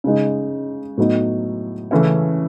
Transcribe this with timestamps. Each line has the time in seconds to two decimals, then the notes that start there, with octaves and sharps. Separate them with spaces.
0.04 C#3 G#3 D#4
0.97 A2 F#3 B3 D#4
1.91 C#3 E3 A3 C#4 E4